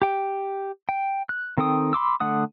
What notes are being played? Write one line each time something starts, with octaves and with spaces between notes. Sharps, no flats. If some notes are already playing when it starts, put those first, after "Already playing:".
G4 G5
G5
F#6
D#3 C4 A4 G5 D#6
B5 C6 D6 E6
D3 A3 F#5 D#6